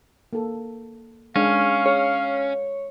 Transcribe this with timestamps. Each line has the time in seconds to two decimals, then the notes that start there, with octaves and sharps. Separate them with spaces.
0.33 A#3 A4
1.36 G#3 C#4 D4 F5
1.86 G#4 C#5